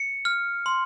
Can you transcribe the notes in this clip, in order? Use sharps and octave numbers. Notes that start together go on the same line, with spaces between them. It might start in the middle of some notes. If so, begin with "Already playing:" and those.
Already playing: C#7
F6
C6